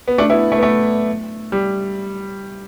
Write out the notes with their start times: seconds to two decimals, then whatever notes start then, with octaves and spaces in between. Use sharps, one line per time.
0.08 B3
0.18 A3 D4
0.30 B3 E4
0.52 A3
0.58 B3
0.63 A3
1.52 G3